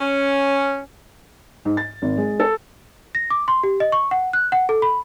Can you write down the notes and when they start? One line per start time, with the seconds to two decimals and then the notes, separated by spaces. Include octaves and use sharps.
0.01 C#4
1.65 G#2
1.77 A6
2.02 G#1
2.17 G#3
2.40 A4
3.15 A#6
3.30 D6
3.48 C6
3.63 G4
3.80 D#5
3.92 C#6
4.11 F#5
4.33 F#6
4.52 F#5
4.69 A4
4.82 B5